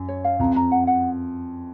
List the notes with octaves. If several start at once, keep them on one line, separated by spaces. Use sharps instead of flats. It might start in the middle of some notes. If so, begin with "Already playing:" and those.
Already playing: F#2
C#5
F5
F2 A#5
A#5
F#5
F#5